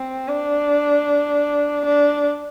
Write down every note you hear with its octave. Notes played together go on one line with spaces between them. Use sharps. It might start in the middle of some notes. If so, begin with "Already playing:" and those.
Already playing: C4
D4
D4